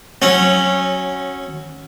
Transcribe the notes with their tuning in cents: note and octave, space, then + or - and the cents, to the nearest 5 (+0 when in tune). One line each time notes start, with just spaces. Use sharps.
F#3 +0 C#4 -15